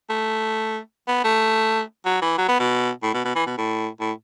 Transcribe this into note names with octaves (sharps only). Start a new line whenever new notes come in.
A3
B3
A3
F#3
E3
F#3
B3
B2
A2
B2
B2
E3
B2
A2
A2